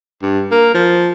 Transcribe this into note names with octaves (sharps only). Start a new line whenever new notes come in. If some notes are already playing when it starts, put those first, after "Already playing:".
G2
A#3
F3